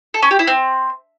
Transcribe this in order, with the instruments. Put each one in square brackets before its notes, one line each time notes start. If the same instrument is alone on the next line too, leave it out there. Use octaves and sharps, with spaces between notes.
[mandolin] A4
C#4
G4
E4
C4